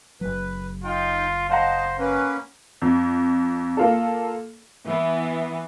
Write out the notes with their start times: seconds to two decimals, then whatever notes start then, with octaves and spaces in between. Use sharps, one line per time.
0.21 F#1 F#3 B4
0.84 D#4 F4 G5
1.50 C5 D#5 F5 F#5 A5 A#5
1.99 A#3 C#4 B4
2.82 F2
3.77 A#3 F4 A4
4.86 E3 B3